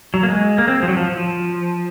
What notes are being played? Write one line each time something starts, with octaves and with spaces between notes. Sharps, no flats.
F#3
A#3
G#3
A#3
C4
F3
F#3
F3
F3